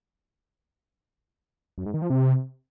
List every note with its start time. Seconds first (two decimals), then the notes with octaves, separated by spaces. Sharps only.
1.78 F#2
1.86 G#2
1.94 D#3
2.02 F3
2.10 C3